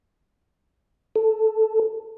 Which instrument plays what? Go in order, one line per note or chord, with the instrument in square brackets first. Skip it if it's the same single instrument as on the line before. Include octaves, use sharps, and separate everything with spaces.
[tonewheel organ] A4